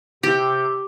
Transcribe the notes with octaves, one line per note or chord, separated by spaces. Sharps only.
C3 G4 G6